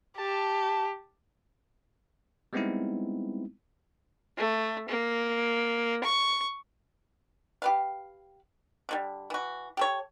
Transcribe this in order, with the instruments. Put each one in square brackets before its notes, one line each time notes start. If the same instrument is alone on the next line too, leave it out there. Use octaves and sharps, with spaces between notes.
[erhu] G4 [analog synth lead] A5
[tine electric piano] G3 G#3 B3 C4 D#4 E4
[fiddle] A3
A#3
C#6
[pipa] G4 B4 F5
D3 F3 G3
E3 F#4
G4 A4 C#5